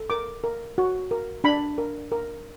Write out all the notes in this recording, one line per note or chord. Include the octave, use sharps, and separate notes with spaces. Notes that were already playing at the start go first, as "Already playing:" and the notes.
Already playing: A4
A#4 D6
A#4
F#4
A#4
D4 B5
A#4
A#4